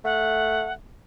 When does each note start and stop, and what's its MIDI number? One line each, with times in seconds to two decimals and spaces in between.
0.04 0.73 57
0.04 0.72 78